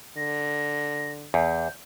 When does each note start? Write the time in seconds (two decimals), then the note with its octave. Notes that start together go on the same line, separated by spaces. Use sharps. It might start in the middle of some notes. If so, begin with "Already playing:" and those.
0.17 D3 A#6
1.34 E2 G6